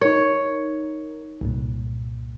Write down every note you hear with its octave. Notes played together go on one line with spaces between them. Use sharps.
D#4 A#4 C#5
C2 G2 A#2